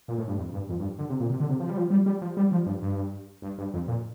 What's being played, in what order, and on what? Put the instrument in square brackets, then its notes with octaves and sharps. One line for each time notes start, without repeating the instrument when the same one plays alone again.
[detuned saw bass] A#2
A2
G2
F2
G2
F2
G2
D3
C3
A#2
C3
D3
C3
F3
G3
F3
G3
G3
F3
G3
F3
G2
G2
G2
G2
F2
A#2